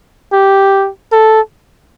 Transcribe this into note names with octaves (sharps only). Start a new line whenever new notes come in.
G4
A4